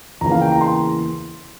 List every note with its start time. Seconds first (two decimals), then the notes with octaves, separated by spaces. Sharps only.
0.21 E2 C#3 E3 A#3 A#5
0.32 F5
0.41 G5
0.52 A#5
0.61 C6